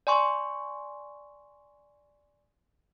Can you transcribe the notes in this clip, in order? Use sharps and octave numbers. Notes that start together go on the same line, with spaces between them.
D5 G#5 C6 C#6